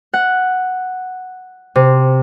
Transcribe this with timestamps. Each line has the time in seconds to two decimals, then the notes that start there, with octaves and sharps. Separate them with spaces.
0.14 F#5
1.76 C3